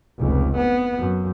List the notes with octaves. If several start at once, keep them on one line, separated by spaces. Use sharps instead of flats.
F1 C#2
B3
F#2